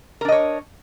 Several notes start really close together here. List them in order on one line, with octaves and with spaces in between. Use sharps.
A#4 D4 D#5 C#5